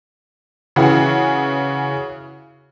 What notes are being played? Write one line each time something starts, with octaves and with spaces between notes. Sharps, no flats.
C#3 E3 E4 F#4 G#4